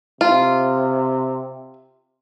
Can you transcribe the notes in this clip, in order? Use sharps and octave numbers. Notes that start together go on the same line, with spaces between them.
C3 F4